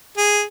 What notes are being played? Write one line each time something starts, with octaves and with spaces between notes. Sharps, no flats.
G#4